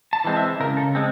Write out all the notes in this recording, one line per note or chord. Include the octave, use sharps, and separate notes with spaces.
A5
E3 G#3 C4
E5
C#3 A#4
A4
G#3 C4